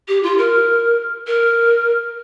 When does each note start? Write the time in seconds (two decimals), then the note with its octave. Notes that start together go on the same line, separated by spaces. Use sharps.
0.08 G4
0.23 F4
0.38 A#4
1.27 A#4